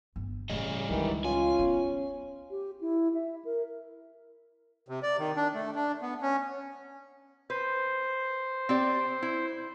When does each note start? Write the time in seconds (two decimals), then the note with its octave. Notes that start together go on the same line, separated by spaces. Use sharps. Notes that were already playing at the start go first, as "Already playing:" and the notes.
0.16 G1
0.50 A2 C#3 G3 D#5
0.90 C#2 D#3 E3
1.25 C#4 F4 G#5
1.59 B3
2.51 G4
2.81 E4
3.14 E5
3.45 A#4
4.88 C3
5.03 D5
5.19 D#3
5.37 D4
5.54 A3
5.75 D4
6.02 B3
6.22 C#4
7.50 B4 C5
8.69 C4 G4 D5
9.22 E4